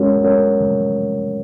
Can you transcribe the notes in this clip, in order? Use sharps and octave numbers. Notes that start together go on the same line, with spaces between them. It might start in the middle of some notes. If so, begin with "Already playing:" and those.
Already playing: G#3 C#4 F#4 A#4 C#5
G#3 C#4 F#4 A#4 C#5